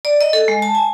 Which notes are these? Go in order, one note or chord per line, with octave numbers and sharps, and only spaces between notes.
D5
D#5
A4
G#3
A5
G#5